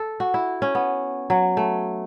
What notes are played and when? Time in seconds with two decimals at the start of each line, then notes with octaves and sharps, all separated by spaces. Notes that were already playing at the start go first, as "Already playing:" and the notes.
Already playing: A4
0.20 F#4
0.34 E4
0.62 C#4
0.75 B3
1.30 F#3
1.57 A3